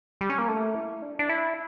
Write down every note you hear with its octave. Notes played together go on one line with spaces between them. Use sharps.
G3
C#4
A#3
A3
E4
D4
D4
E4